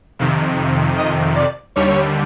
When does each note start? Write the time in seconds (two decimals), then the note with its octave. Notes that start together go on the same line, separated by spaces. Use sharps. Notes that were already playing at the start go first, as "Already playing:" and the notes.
0.19 F2 C3 D#3
0.98 D#5
1.36 D5
1.76 D#2 D3 G3 C#5